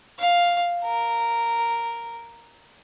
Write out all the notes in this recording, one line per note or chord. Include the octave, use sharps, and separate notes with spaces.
F5
A#4